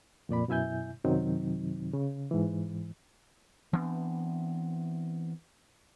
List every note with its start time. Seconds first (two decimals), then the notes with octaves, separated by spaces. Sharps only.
0.29 F2 A#2 D5 B5
0.48 F#2 B2 E4 E5 G#5 G6
1.05 F#2 C3 D#3 F#3 C4 D#4
1.93 C#3
2.31 G#2 E3
3.73 E3 B3 C4 D4